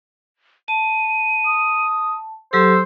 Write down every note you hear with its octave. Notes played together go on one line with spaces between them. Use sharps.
A5 D#7
D#6
F#3 G4 A4 C5 E6